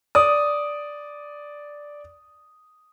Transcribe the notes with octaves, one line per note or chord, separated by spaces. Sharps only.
D5 D#6